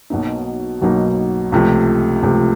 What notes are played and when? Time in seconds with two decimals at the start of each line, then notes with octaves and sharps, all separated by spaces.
0.10 B1 B2 F#3 A#3 D#4
0.81 B1 B2 F#3 A#3 D#4
1.52 C#2 C3 F3 A3
2.23 C#2 C3 F3 A3